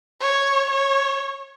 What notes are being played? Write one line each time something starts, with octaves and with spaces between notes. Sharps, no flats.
C#5
C#5